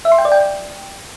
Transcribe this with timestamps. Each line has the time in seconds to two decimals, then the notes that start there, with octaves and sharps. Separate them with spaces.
0.05 E5
0.12 C6
0.18 G5
0.25 D5
0.32 G5